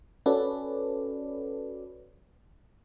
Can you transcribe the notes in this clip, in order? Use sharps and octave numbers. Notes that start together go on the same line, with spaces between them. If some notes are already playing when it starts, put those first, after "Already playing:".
C#4 F#4 A4 B4 D5